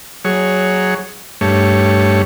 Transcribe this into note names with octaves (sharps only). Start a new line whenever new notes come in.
F#3 G#4 C#5
G2 A3 C#5